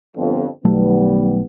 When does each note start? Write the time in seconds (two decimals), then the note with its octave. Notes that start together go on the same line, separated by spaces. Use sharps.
0.17 G1 F2
0.65 B1 D#3 F#3 G3 A3 B3